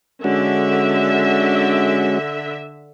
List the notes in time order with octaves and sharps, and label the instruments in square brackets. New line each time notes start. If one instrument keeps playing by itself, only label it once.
[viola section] D3 E5 [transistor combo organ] G#3 C#4 F#4